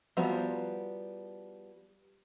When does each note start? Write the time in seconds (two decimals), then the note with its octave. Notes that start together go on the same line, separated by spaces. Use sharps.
0.17 F3 G3 B3 F#4 A#5